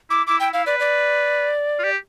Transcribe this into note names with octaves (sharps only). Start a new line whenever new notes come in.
E4 D6
E4 D6
E4 G5
E4 F5
B4 D5
D5
F4
G4